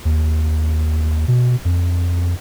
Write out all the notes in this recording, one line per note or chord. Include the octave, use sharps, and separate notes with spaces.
D#2
B2
F2